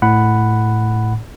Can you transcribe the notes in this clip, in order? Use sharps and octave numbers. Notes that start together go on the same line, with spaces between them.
A2 F#5 B5